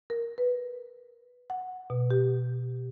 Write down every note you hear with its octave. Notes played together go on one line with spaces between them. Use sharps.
A#4
B4
F#5
B2
G4